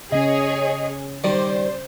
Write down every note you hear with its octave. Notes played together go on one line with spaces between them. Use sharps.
C#3 C#4 G#4 C#5 D#5
D#3 G3 C5 D5